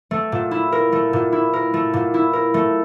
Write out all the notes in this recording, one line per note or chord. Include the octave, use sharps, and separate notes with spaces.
A3
A#2
E4
A#4
A3
A#2
E4
A#4
A3
A#2
E4
A#4
A3